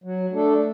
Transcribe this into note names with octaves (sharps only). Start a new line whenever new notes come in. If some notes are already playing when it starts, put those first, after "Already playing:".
F#3
A3 D4 A4